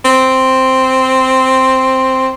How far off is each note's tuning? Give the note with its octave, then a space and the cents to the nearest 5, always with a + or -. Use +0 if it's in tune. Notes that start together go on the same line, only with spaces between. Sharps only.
C4 +0